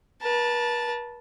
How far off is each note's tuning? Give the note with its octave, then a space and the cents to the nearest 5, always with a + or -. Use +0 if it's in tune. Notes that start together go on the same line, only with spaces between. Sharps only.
B4 -45 A5 +0